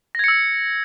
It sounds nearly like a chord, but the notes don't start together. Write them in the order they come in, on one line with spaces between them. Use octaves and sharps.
A#6 G#6 C#7 E6